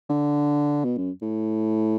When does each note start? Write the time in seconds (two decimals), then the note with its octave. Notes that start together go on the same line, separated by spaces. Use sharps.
0.09 D3
0.85 B2
0.97 F#2
1.22 A2